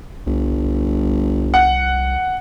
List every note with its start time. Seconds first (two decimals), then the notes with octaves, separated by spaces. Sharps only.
0.26 G1 C2
1.54 F#5